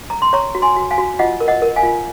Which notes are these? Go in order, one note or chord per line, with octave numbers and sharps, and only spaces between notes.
A#5
C6
C#5 A#5 C#6
F#4
G#5 C6
F#4
F5 G#5
F#4
F4 D#5 F#5
A#4
D#5 F#5
A#4
F5 G#5
F4